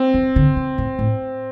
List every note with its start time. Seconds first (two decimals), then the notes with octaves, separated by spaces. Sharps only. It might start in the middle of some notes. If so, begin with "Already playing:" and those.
Already playing: C4
0.14 E3
0.36 D3
0.57 E3
0.78 A2
0.99 A2